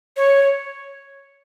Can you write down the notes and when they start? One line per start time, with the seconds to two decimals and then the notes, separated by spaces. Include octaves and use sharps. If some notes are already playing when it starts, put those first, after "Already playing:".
0.17 C#5